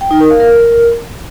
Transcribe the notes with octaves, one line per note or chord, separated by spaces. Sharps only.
G5
D#4
A#4
F5
A#4